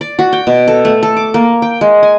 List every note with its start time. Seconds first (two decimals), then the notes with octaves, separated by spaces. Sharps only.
0.01 D5
0.19 F#4
0.33 G5
0.47 B2
0.68 A4
0.85 A3
1.03 A4
1.17 D6
1.34 A#3
1.62 G5
1.81 G#3
2.03 G#5